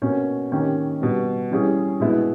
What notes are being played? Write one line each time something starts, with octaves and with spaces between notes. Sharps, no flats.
B2 A#3 C#4
D#3 A#3 C#4 G4
B2 G3 B3
E3 G3 C#4 G#4
B2 G#3 B3 E4